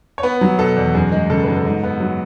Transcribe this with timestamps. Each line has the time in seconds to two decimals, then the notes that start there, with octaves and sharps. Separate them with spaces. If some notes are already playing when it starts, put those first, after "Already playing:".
0.18 C#5
0.23 B3 B4
0.41 F#3
0.58 B2 A4
0.76 E2
0.94 F#2 G#4
1.12 G#3
1.30 C#3 A4
1.43 F#2 B4
1.57 A4
1.65 G#2
1.83 B3
2.00 F#3